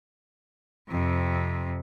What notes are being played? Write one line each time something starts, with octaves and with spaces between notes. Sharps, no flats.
F2 C3